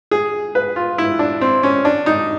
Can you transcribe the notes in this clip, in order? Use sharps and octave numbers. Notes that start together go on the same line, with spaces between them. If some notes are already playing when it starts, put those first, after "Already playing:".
G#4
B4
F4
E4
D4
C4
C#4
D4
D#4